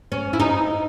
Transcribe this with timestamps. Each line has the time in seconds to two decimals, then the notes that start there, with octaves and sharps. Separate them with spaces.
0.12 C#4
0.33 E4
0.40 D#4